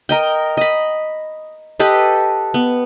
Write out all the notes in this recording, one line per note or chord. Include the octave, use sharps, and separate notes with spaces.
A#4 D#5 G5
D#5 B5
G4 A4 B4 D#5
B3